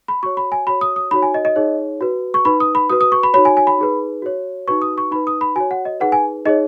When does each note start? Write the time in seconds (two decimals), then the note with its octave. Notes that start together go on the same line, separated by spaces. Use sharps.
0.08 B5
0.23 F#4 C#6
0.26 C#5
0.37 B5
0.52 G#5
0.67 F#4 B5
0.70 C#5
0.81 D#6
0.96 D#6
1.11 D#4 F#4 C#5 B5
1.22 G#5
1.34 D#5
1.45 D#5
1.56 D#4 G#4 C#5
2.01 F#4 B4
2.34 C#6
2.45 D#4 B4 B5
2.60 D#6
2.75 B5
2.90 F#4 B4 D#6
3.01 D#6
3.12 C#6
3.23 B5
3.34 D#4 F#4 C#5 B5
3.45 G#5
3.57 G#5
3.67 B5
3.79 D#4 G#4 B4
4.22 F#4 C#5
4.68 D#4 F#4 B4 C#6
4.82 D#6
4.98 C#6
5.11 D#4 B5
5.16 B4
5.27 D#6
5.41 B5
5.56 F#4 C#5 G#5
5.71 F#5
5.85 D#5
6.00 D#4 G#4 B4 F#5
6.12 G#5
6.45 D#4 G#4 C#5 D#5